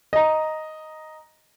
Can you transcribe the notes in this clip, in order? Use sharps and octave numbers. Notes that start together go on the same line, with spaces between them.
D#5 A#5